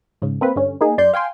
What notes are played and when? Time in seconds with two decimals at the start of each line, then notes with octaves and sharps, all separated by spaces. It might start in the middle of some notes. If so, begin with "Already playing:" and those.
0.22 G#2 C#3
0.41 A#3 C4 B4
0.56 G2 D3 C#4
0.81 A#3 D#4 G#4
0.98 F#2 D5 C6 G6
1.13 F5 G5 G#5 C6